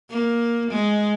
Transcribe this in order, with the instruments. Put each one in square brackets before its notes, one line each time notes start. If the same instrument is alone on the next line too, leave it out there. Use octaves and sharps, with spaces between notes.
[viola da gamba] A#3
G#3